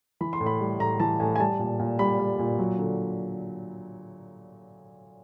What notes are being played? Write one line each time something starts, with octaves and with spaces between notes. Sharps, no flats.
E3 B5
C6
A2
B5
G3
A2 A#5
E3 A5
A2 G#5
G#5
G3 A5
A#2
A#2
G3 B5
G3
A#2
F#3
D3